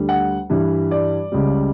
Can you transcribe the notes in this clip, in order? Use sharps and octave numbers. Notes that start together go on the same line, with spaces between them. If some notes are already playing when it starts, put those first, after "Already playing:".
Already playing: D2 D3 G3
F#5
G2 E3 G3
D5
C#2 C#3 G3